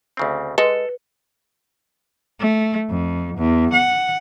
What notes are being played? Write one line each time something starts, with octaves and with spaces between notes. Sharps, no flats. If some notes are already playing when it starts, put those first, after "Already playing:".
D2 C#3 C4
G#3 A4 B4
A3
F2
E2
F#5